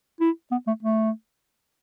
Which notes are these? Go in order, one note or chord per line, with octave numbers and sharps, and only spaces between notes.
E4
B3
A3
A3